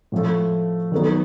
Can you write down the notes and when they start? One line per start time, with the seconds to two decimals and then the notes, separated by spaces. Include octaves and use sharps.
0.12 A2 F3 A3
0.92 D#3 F#3 B3